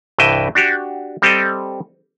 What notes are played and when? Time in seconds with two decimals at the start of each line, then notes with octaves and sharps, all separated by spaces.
0.18 C2 G2 E3 D#5 E5 G5
0.55 D4 F#4 G4
1.22 G3 C4 G4 A4 D#5